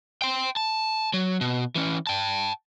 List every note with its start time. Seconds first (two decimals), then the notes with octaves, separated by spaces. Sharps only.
0.22 G5 C6
0.57 A5
1.14 F#3
1.41 B2
1.75 E3 C#4
2.07 G5 A5